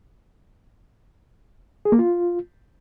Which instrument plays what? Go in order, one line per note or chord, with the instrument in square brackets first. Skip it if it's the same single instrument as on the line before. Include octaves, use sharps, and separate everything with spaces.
[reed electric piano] G#4
A#3
F4